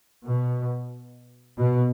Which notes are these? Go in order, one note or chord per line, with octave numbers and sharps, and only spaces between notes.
B2
B2